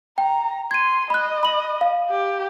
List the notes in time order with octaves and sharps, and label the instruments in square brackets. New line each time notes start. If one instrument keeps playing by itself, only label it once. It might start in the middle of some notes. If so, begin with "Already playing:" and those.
[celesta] G5 [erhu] A#5
[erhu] C6 [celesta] G#6 D#7
[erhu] D#5 [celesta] B5 F#6
[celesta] B5 F#7
F5
[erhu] G4